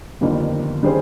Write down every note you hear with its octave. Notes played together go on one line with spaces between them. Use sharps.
G1 F2 D#3 G3 A#3
D#3 G3 C#4 G#4 C5